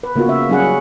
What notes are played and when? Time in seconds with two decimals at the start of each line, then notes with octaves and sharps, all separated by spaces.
0.03 B4
0.15 C#3 A#3 B3 F4 F#4
0.29 E5
0.49 F#3 G3 C#4 E4 G#4 F#5
0.62 F#4